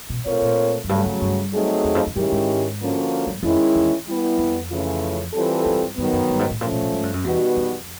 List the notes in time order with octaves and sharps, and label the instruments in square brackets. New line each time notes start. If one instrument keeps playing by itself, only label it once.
[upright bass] B2
[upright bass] B2 [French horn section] A3 C4 F4 A#4 C#5
[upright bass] A#2
F#2
[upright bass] G2 [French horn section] C#3 F#3 A3
[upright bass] G2
G2
[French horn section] F#3 A3 C4 D#4 G#4
[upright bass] E2
F2
F2
[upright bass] F#2 [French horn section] D#3 G#3 C#4 E4 G4
[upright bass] G#2
[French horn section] D3 F3 A#3 C#4 F#4
[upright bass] F#2
[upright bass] F2 [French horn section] D#3 G#3 C#4 E4
[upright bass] E2
[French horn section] G3 B3 E4
[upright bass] F2
[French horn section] C#3 E3 A3 C#4 F4
E3 G3 C4 F4 A4
[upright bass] F#2
G2
[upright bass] G2 [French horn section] D#3 F#3 B3
[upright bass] F#2
G2
G#2
A2
[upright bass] A#2 [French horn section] F3 A3 C#4
[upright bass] A#2
A#2
G#2
G2
F#2
[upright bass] E2 [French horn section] B2 G3 B3 D#4 F#4
[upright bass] F2